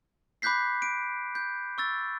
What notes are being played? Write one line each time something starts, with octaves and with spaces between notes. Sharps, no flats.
B5 D6 F#6 G6 B6 C7
D7
G6
C#6 E6 A6